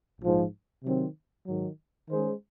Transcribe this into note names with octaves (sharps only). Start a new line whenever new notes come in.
A#1 G#2 F3
C3 D#3 F#3 C4
G#2 D#3 F#3
D#3 G#3 C#4 G#4 C5